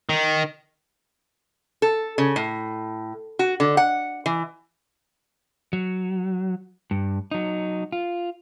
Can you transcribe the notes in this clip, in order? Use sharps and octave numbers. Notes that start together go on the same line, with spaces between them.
D#3
A4
C#3
A2
F#4
D3
F#5
E3
F#3
G2
F#3 D#4
F4